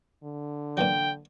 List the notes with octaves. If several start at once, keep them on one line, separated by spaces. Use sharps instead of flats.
D3
A#2 E3 F#3 G5